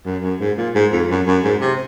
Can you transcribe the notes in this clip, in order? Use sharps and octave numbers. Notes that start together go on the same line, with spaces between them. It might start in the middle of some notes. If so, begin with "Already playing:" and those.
F#2
F#2
G#2
A#2
G#2
F2
F#2
F#2
G#2
C3